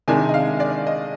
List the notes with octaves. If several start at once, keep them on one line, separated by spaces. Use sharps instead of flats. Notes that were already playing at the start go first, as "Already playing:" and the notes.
C3 D#3 G#3 D4 G#5
D#5
F5
D5
D#5